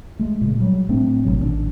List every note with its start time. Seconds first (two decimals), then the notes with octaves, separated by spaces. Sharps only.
0.19 G#3 A3
0.41 A#2 C#3
0.60 F#3 G3
0.89 A2 A3 C4 D4
1.25 G#1 B2 F#3
1.38 A1 D#3 C4 D4